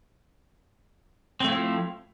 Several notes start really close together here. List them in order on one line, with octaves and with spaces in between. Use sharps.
C4 A3 E4 F3